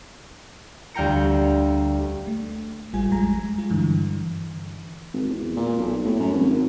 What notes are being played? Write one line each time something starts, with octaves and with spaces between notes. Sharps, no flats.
D2 G3 F5 G5 A#5 C#7
A3
A1 G3 F4 G#5
F2 G#3 G#5 A#5
F4
G2 D3 E3
G#1
E2
A#2
B1
A2
F#2
G#1